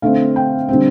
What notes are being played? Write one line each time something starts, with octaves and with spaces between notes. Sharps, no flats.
D3 A3 C4 F5
G5
D3 G3 C4